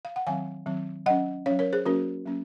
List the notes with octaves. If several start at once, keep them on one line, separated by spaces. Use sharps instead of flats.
F5
F#5
D#3 F#3 C4 F5 G#5
D#3 F#3 C4
F#3 C#4 D#5 F#5
F#3 C#4 C#5 F5
A#4 C#5
G#4 C5
F#3 A#3 C#4 F#4 A#4
F#3 A#3 C#4